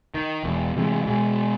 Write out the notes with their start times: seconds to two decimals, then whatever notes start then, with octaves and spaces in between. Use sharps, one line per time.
0.14 D#3
0.43 E1 E2
0.76 A2 C3 E3 G#3
1.06 B2 G#3